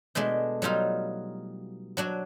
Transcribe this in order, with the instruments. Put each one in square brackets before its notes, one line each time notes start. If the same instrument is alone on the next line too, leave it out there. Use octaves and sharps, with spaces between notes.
[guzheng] B2 G#3 A3 D4
F#3 G3 D#4 F4
F#3 D4 F#4